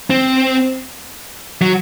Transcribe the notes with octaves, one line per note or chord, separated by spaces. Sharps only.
C4
F#3